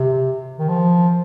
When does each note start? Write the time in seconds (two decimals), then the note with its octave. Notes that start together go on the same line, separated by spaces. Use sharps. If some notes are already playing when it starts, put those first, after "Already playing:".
Already playing: C3
0.59 D#3
0.69 F3